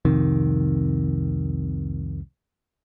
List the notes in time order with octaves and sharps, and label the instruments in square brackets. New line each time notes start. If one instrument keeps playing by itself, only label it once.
[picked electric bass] C2 F2 C3 D#3